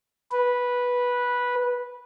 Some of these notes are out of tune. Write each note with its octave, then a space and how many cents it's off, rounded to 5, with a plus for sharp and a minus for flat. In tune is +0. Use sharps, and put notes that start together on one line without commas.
B4 -10